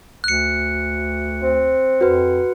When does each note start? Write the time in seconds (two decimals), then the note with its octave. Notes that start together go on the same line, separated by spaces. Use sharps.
0.24 D2 F#6 C#7
1.42 C4
2.01 F2 F#4 B4